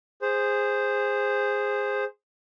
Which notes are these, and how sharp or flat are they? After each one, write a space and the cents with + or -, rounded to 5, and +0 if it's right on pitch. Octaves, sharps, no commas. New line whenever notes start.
G#4 -10 C5 +0